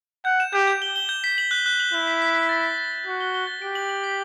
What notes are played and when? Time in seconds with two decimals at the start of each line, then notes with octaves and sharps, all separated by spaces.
0.25 F#5 G6
0.40 E7
0.53 G4 G6
0.67 G6
0.82 G7
0.96 G7
1.09 G6
1.24 B6
1.38 F#7
1.51 F#6
1.66 F#6
1.80 F#7
1.94 E4 F#7
2.07 B6
2.22 B6
2.35 F#6
2.49 A6
2.64 A6
2.78 A6
2.92 A6
3.06 F#4 A6
3.20 G7
3.34 G7
3.47 A6
3.62 G4 D7
3.75 F#7
3.89 F#7
4.04 B6